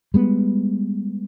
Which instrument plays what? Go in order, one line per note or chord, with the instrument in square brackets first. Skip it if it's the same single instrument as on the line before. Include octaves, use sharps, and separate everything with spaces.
[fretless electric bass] G3 G#3 B3